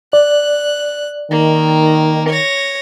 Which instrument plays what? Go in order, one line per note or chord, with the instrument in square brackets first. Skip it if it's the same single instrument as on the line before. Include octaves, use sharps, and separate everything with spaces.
[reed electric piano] D5 [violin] F#6
[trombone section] D#3 [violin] A#3
[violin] C#5 A#6